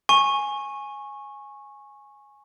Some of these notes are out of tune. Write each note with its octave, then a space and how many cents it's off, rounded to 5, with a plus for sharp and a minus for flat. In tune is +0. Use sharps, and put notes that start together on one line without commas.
G#5 +0 C#6 -20